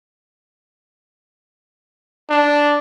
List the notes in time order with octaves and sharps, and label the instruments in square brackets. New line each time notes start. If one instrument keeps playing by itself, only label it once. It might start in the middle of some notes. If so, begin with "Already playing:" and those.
[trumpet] D4